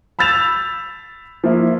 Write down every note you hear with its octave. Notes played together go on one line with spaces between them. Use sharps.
B5 E6 G6 A6 E7 F7
F3 A#3 E4